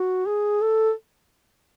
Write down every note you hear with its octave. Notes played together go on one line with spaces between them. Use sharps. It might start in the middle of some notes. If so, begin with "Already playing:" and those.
Already playing: F#4
G#4
A4